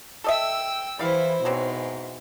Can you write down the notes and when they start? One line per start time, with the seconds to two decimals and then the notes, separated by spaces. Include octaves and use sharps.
0.24 A4 D#5 E5 G5 E6
0.99 E3 G3 E4 C5 F5
1.45 G#2 B2 E3 F#3 C4